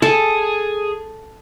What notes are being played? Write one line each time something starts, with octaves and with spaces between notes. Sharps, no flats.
G#4 A4 G#5